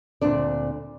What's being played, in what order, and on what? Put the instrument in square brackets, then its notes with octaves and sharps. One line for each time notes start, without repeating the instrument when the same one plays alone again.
[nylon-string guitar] D2 A#2 C4 D4 D5